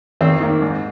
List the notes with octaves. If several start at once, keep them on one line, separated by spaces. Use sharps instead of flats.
D#2 C4
D#3 A#3
G#2